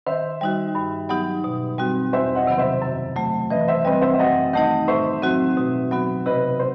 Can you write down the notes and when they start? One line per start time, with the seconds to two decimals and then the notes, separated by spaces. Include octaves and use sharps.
0.06 D#3 C5 E5
0.41 G3 D#4 F#4
0.75 G2
1.09 F#3 B3 D#4 G4
1.44 B2
1.79 G3 C4 F#4
2.13 E2 C5 E5
2.35 D#5 F#5
2.47 C3 D#3 F#3 B3
2.58 C5 E5
2.82 F#2
3.16 F#3 A3
3.50 E3 B4 D#5
3.68 C5 E5
3.85 G3 C4 B4 D#5
4.02 C5 E5
4.14 E5
4.19 F#2 D#5 F#5
4.53 D#3 A3 D#4 D#5 F#5
4.88 A2 C5 E5
5.22 F#3 C4 D#4 F#4
5.57 B2
5.91 F#3 B3 F#4
6.26 C3 B4 D#5
6.59 C5